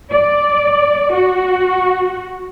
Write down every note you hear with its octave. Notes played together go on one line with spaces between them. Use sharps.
D5
F#4